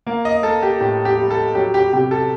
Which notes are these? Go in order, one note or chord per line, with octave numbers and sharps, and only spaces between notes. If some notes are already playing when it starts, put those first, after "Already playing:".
A#3
D#5
A#3 A4
G4
A2 G4
G4
G3
A4
F#3 G4
G4
C3 G4
A4